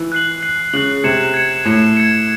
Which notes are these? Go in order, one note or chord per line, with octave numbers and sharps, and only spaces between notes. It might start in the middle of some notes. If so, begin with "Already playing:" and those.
Already playing: E3
F#6 C7 F#7
F#6 C7 F#7
C#3 F#6 C7 F#7
C3 G#6 C#7 E7
G#6 C#7 E7
A2 G#6 C#7 E7
G#6 C#7 E7